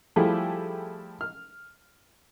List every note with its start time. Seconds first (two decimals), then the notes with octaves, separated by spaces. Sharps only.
0.16 F3 G3 A3 E4 G4 G#4
1.21 F6